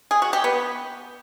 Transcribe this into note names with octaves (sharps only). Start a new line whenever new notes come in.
G#4
F#4
G4
B3